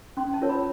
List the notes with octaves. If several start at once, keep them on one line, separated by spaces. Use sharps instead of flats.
C#4 C6
A5
F4 A#4 C#5
B5